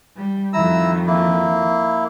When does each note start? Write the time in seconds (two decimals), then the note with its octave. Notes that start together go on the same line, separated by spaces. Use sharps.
0.16 G3
0.53 F2 D#3 E4 A#5 E6
1.07 A#3 E4